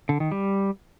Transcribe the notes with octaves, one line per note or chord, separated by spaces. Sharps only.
D3
D#3
G3